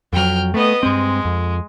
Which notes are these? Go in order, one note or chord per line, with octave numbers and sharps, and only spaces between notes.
F2 F#3 G5 F6
A3 B3 D#5
G2 G#3 C4
F2